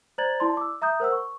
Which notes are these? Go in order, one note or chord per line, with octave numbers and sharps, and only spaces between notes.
C5 D5 A#5 G#6 A6 F#7
E4 D5 A5 C6
D6 E6
E5 A#5 D#6 G6
A#4 C5 F#5 E6
C#6